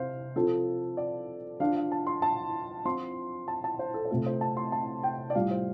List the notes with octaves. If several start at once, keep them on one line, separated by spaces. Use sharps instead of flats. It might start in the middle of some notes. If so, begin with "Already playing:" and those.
Already playing: C3 C5 F5
F3 C4 F4 A4
D5
F3 D4 F4 F5
F5
A5
C6
A5
F3 C4 F4 C6
A5
A5
C5
A4
C5
C3 A3 F4 A4
C5
A5
C6
A5
G5
D5
A2 G3 F4 F5
C5